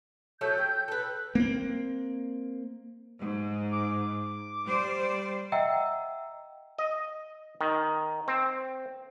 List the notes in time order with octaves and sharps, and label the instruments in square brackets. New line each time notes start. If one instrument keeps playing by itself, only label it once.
[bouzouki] F#3 A3 A4 [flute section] G6
[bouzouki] G5
A4 B4
[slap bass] A#3 C4
[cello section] G#2
[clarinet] D6
[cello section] G3 C5 D5
[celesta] D#5 E5 F#5 G5 A#5 E6
[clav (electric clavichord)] D#5
D#3
C4